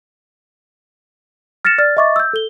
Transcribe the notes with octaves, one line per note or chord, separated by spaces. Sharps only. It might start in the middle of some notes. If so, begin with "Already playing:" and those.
F6 A6 A#6 C#7 E7
D5 F6 A6
D#5 E5 C#6 D6 A6
E6 G6
A4 G7